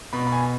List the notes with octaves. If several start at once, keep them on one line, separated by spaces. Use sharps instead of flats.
B2 B5
B5
G#5